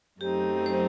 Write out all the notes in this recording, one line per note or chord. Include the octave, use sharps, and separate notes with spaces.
F#2 F#3 A3 C4 D#4 G4
C5